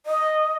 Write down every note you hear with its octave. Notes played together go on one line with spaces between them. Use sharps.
D#5